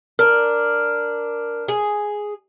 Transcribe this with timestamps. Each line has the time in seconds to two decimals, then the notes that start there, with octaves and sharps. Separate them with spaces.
0.19 D4 A#4
1.68 G#4